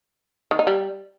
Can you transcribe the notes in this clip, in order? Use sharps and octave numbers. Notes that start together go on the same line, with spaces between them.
D#3
D#4
G3